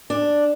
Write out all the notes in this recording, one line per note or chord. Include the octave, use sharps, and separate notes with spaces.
D4